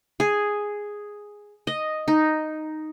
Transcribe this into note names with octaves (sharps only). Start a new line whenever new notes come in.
G#4
D#5
D#4